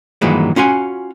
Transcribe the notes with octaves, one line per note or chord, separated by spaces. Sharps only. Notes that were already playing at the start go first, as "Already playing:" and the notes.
G2 A#2 D#3 E3 F#3 G#3
C#4 F4 F#4 G#5